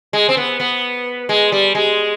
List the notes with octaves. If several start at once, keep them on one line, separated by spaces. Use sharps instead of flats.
G#3
C4
B3
B3
G#3
G3
G#3